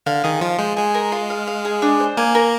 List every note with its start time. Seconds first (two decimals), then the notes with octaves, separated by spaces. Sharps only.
0.06 D3 F5
0.24 D#3 G#4
0.41 F3 F4
0.59 G#3 C5
0.77 G#3 G#5
0.94 A#4
1.12 F4
1.30 F5
1.47 F5
1.65 G#4
1.82 D4
2.00 C5
2.17 A#3 G#5
2.35 A#4